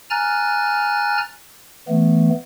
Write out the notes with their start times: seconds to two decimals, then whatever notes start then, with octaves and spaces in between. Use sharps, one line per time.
0.10 G#5 A#5 F6 F#6 A6
1.88 E3 A3 B3